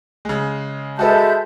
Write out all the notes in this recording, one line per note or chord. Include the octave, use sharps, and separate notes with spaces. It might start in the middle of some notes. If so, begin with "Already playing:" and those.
C#3 G#3
G#3 F#4 A4 B4 E5 A5 G6